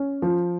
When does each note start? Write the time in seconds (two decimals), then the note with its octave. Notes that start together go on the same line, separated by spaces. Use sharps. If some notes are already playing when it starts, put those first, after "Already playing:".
Already playing: C#4
0.22 F3